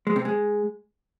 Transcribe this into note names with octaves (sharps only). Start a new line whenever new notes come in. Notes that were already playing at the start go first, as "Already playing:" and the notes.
G#3
C3
G#3